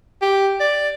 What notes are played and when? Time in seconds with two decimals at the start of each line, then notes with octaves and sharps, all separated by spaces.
0.21 G4
0.60 D5